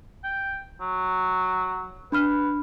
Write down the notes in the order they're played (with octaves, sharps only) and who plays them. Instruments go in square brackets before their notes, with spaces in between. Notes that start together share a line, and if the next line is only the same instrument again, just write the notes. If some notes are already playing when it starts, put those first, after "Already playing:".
[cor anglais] G5
F#3
[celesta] D4 B5 F6 [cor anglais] B4